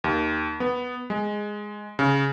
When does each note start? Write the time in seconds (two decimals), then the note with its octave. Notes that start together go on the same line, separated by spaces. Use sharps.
0.04 D#2
0.60 B3
1.10 G#3
1.99 C#3